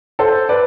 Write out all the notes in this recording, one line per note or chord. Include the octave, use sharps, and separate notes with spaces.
A4 C5
B4 D5